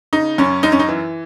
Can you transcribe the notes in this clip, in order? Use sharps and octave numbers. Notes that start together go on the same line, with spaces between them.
C#3 D#4
F#2 C#4
F#2 D#4
C#4
D#4
E3